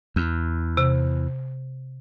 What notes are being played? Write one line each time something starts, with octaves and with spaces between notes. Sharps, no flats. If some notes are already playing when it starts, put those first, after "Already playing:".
E2
C3